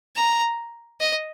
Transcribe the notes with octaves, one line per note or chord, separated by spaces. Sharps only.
A#5
D#5